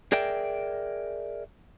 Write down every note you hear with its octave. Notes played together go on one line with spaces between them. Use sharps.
G#4 A#4 D5 E5 G5